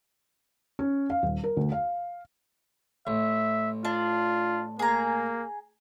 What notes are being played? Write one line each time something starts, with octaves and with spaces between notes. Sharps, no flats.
C#4
F5
D#1
A#4
D2
F5
A1 E5
D4 F4
A#3 G#4 A#5